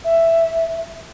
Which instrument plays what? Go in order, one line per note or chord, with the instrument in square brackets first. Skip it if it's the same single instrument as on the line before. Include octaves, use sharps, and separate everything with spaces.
[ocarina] E5